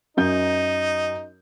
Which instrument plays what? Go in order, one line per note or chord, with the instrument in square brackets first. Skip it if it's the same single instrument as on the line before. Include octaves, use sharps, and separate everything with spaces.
[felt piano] F#2 D#5 G6 [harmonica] D#4